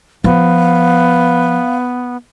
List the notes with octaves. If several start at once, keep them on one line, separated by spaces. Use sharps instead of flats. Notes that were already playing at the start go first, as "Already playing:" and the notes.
F3 B3 F5